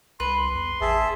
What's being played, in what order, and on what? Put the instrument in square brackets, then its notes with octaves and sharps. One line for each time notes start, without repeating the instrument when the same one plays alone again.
[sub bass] C2 [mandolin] B4 [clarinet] C6
[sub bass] E2
[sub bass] A1 [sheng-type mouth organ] G#4 E5 A5